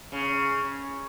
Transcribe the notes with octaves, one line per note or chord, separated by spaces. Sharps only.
C#3